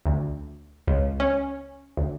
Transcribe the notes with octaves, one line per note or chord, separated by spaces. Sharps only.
D2
C#2
C#4
D2